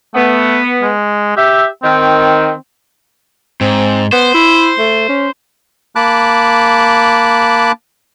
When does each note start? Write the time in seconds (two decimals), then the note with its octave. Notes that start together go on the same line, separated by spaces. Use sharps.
0.14 A3 B3
0.82 G#3
1.37 G4 E5
1.83 D#3 C4
3.61 G#2 C4
4.12 B3 C5
4.34 E4
4.79 A3
5.09 C#4
5.96 A#3 A5 B5 D6 F#6